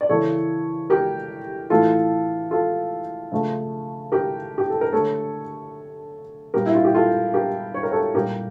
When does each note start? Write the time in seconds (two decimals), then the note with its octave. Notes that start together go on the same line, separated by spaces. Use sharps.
0.01 D5
0.09 C#3 E3 A#3 A4 C#5
0.90 G4 A#4
1.70 A2 E3 A3 F4 A4
2.51 F4 A4
3.32 C#3 F3 A3
4.12 G4 A#4
4.58 G4
4.70 A4
4.81 A#4
4.92 D3 A3 A4 C#5
6.54 A#2 G3 A#3 G4 A#4
6.66 E4
6.75 F4
6.85 G4
6.94 F4 A4
7.34 G4 A#4
7.74 C#5
7.83 A#4
7.91 A4 C#5
8.15 A#2 G3 A#3 G4 A#4